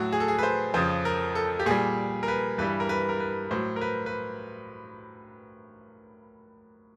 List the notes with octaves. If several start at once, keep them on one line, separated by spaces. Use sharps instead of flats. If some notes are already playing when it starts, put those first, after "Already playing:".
Already playing: A2 F#3 F#4
G#4
A4
G#4
B4
C5
F2 C#3 F3 C5
A#4
A4
G4
A#2 G3 G#4
A#4
B4
G2 E3 G3 B4
A#4
B4
A#4
B4
A2 F#3 C5
A#4
B4
B4